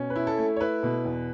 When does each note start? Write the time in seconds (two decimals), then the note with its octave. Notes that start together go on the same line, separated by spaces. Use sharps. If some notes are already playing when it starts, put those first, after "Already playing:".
Already playing: B2 C#4
0.10 B4
0.16 E4
0.27 A4
0.38 A3
0.56 C#5
0.60 E4 B4
0.83 B2
1.05 E2